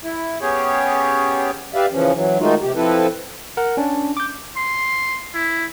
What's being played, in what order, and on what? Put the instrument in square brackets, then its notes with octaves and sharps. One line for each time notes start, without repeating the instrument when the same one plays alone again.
[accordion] E4
B3 C#4 G4 G#4 C#5
[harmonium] G4 B4 D5 E5 F5
C#3 E3 F3 C#4
E3 F#3
D#3 G#3 A3 D#4 F4 F#4
C3 G4
F3 C4 E4 A4 B4
[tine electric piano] A#4 F#5
C#4 D4
D6 G6
[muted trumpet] C6
E4